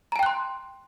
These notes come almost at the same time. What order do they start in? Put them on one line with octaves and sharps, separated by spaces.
A#5 A5 G5 F#6 C6